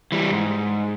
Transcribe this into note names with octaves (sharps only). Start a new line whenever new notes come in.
E3 G3
G#2